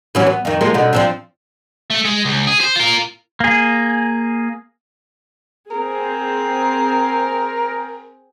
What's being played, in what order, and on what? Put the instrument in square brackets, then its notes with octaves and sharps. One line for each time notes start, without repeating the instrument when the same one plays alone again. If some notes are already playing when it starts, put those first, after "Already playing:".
[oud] E3 F#3 C#4
B3
F2 D#3
F3 G#3 A#3
B2 D3 D#4
F3 C4 D4
[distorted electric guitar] A3
G#3
C#2
G#4
C5
F4 A#4
[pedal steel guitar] A#3 G#4
[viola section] C4 G#4 [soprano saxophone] A#4